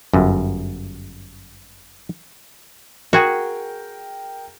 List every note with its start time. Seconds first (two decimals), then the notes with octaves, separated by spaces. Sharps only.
0.13 G1 F#2
3.13 F#4 G#4 A#4 G5